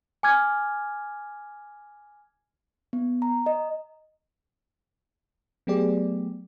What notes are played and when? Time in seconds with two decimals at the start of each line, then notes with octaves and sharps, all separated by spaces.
0.23 G#5 D6 F6 G#6
2.93 B3
3.22 A#5
3.46 D#5
5.67 F#3 A3 B3 G4 G#4 D5